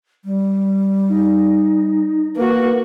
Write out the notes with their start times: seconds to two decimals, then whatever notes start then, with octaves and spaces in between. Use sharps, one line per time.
0.25 G3
1.09 D#4
2.36 A#3 F#4 A#4 B4